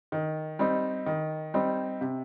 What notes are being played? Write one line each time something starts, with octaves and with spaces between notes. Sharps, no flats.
D#3
G3 C4 D#4
D#3
G3 C4 D#4
C3